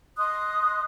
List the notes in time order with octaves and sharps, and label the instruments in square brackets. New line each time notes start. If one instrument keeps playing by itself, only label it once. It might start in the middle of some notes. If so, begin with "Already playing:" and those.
[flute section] D#5 C6 D#6 F#6